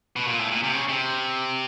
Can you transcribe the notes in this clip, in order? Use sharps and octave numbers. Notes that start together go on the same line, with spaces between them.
B2
A#2
A2
A#2
C3
C#3
C3